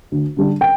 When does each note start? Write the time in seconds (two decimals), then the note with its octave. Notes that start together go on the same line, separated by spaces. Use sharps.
0.12 D2
0.37 D3 G3 D4
0.61 G5